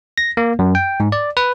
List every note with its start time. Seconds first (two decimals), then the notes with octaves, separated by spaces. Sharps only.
0.18 A#6
0.37 A#3
0.59 F#2
0.75 G5
1.00 G#2
1.12 D5
1.37 B4